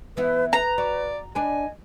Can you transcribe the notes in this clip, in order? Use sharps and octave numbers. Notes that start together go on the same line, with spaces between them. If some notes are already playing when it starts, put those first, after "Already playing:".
E3 B3 E4 B4
B4 A#5
F#4 D5
D4 B4 D#5 G#5